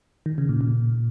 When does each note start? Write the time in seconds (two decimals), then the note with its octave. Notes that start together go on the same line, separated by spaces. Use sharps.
0.26 D#3
0.38 C#3
0.49 A#2
0.61 A#2